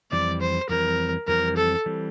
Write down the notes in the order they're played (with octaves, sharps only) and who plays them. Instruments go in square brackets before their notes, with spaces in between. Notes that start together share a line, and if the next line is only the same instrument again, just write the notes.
[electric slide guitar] F2 E3 G3 C4 [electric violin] D5
[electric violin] C5
[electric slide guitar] F2 E3 G3 C4 [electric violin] A#4
[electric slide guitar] F2 E3 G3 C4 [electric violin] A#4
[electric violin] A4
[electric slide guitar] E3 G3 C4